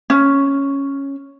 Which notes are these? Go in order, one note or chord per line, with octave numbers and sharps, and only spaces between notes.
C#4